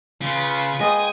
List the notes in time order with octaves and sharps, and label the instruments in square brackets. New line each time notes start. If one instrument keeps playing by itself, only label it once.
[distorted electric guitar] C#3 [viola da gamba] F4 B4
[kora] G#3 D#5 [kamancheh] G5 D#6 [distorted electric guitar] G#5